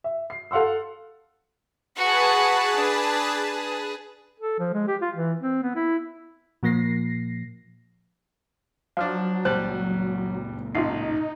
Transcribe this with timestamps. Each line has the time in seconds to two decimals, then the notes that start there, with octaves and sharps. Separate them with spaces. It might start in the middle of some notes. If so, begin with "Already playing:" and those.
0.04 E5
0.30 C7
0.51 A4 F5 F#5 C6 E6
1.96 F#4 G#4 B4 F#5 A5
2.76 D4
3.52 G#4
4.40 A4
4.59 F3
4.74 G#3
4.87 G4
5.02 F4
5.15 E3
5.40 C4
5.63 B3
5.76 E4
6.63 A#2 F3 A#3 A#6 C7
8.97 F3 F#3 D4 F5 F6
9.45 C#2 A#2 G3 C5 A5 F#6
10.75 A1 D#4 F4 E5 C7